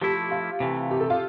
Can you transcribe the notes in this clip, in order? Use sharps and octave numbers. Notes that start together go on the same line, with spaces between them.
F3 A3 E4 G4
F4
C3 E3 A3
G4
A4
F4